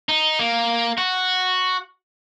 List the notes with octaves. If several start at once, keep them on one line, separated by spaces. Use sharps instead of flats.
D#4
A#3
F#4